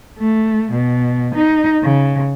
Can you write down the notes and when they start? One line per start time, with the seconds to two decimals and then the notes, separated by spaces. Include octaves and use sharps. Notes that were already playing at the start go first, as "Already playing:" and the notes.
0.18 A3
0.72 B2
1.35 D#4
1.83 C#3